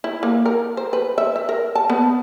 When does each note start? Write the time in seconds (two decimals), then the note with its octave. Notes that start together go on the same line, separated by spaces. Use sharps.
0.04 E4
0.23 A#3
0.46 A#4
0.77 C5
0.93 B4
1.18 E5
1.36 E5
1.49 A#4
1.75 A5
1.90 B3